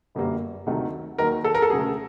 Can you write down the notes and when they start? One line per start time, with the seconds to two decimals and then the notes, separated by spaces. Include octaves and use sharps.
0.15 G1 F#2 D3 G3 A#3
0.66 D2 C3 D#3 F#3 A3
1.18 D#2 D#3 F#3 A#4
1.44 A4
1.54 A#4
1.62 A4
1.70 D2 C#3 F#3 G#4